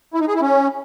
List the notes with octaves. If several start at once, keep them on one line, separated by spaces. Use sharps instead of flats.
E4
D#4
G#4
E4
C#4